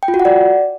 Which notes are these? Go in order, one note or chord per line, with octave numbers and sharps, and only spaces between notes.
G5
F4
F#4
F#5
D5